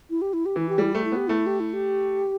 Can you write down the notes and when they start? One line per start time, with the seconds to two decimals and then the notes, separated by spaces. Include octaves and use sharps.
0.10 E4
0.22 G4
0.33 E4
0.46 G4
0.56 E3 E4
0.69 G4
0.78 G3 E4
0.93 A3 G4
1.04 E4
1.12 B3 G4
1.28 A3 E4
1.46 G4
1.60 E4
1.73 G4